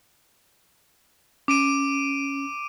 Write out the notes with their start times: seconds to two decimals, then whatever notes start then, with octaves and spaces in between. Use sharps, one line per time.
1.48 C#4 D6 D7 D#7